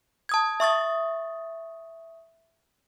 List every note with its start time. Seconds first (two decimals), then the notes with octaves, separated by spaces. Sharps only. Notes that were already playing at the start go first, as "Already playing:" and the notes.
0.29 A5 D#6 G#6
0.60 E5 C#6 D#6 A6